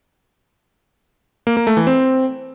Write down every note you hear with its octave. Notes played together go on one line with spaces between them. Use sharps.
A#3
A#3
A3
E3
C4